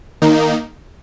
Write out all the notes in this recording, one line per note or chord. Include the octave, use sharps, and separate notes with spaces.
D#3 A#3 D#4